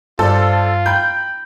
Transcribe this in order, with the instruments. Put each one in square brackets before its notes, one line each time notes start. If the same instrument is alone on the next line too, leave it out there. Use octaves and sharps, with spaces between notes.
[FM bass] G2 [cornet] F4 [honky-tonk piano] A4 [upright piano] C5 D5
[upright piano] G5 A#5 B5 [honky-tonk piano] G6